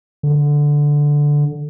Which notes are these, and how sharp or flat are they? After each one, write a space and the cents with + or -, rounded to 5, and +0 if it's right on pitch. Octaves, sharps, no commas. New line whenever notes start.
D3 -5